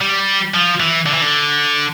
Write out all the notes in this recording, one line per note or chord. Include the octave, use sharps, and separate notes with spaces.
G3
F3
E3
D3
E3
D3